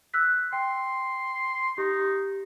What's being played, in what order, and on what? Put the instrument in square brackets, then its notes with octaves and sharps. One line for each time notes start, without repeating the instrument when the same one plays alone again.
[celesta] E6 F#6 B6
[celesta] G5 [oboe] C6
[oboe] D#4 [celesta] G4